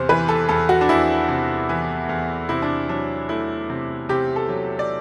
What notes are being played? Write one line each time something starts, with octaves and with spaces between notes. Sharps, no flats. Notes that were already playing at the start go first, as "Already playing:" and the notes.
Already playing: E2 C3 C5
E3 B4
A4
E2 A4
F#4
D4
E2 E4
C3
E3
E2
C3 E4
D4
F#3 D4
A3 E4
C3
C3 G4
A4
F#3
D5